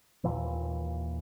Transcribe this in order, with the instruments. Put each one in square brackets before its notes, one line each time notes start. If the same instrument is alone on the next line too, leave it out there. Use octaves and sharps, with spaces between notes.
[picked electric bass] D#2 A#2 E3